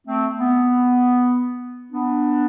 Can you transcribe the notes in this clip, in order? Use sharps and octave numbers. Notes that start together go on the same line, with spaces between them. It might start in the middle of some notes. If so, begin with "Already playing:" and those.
A3 C4
B3
B3 D4